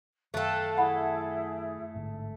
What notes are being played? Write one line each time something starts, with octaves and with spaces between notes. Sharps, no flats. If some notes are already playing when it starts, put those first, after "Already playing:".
F#2 D#3 A3 A4 F5 G5 F#6
E4 G#4 F#5 B5
A1 G#2 D3